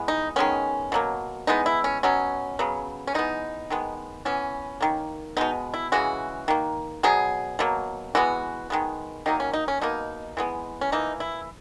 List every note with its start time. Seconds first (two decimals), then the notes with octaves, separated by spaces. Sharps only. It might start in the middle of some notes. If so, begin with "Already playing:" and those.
Already playing: E3 G#3 B3
0.08 D#4
0.36 D#3 G#3 B3 C#4
0.92 B2 F#3 A#3
1.47 E3 G#3 B3 D#4
1.66 E4
1.84 C#4
2.03 B2 F#3 B3 C#4
2.59 C#3 F#3 B3
3.07 C#4
3.15 E3 G#3 B3 D#4
3.70 D#3 G#3 B3
4.25 E3 B3 C#4
4.81 D#3 A#3
5.37 B2 G#3 B3 D#4
5.74 E4
5.92 C#3 E3 G#3 F#4
6.48 D#3 A#3
7.03 B2 F#3 B3 G#4
7.59 B2 F#3 A#3
8.15 E3 G#3 B3 F#4
8.70 D#3 G#3 B3
9.26 D#3 F#3 A#3 D#4
9.40 C#4
9.53 D#4
9.68 C#4
9.81 B2 A#3 D#4
10.37 E3 G#3 B3
10.81 C#4
10.92 E3 A#3 D#4
11.20 E4